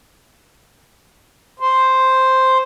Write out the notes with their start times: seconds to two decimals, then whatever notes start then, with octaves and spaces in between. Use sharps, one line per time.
1.60 C5